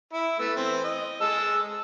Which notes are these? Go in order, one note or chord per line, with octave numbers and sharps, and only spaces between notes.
E4
A3 B3 E6
E3 C4 C5
D#5
G#3 A5 E6